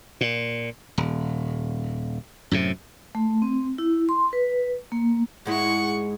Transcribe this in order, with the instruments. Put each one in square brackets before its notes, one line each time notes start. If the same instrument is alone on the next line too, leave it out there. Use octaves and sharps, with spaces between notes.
[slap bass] A#2
D#1
F#2 A2 C3
[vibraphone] A3
C4
E4
C6
B4
A#3
[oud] G#2 G#3 E4 [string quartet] F#5 C#6